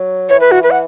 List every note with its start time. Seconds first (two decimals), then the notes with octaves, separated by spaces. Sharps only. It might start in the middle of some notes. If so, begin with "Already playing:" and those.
Already playing: F#3
0.29 E3 C#5
0.41 B4
0.51 F#4
0.63 B4
0.71 F#5